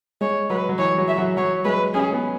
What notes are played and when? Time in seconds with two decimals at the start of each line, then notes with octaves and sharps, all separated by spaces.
0.21 G#3 C#5
0.50 F#3 B4
0.69 F#3
0.78 E3 C#5
0.98 F#3
1.08 E5
1.18 F#3
1.37 F#3 C#5
1.65 G#3 B4
1.94 C#4 G#4
2.13 B3